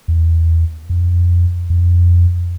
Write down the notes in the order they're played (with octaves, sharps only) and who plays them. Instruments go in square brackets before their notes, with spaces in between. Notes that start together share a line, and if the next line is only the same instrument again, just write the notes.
[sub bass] E2
F2
F2